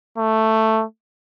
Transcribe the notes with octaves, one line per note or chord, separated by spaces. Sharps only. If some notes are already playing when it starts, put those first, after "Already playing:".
A3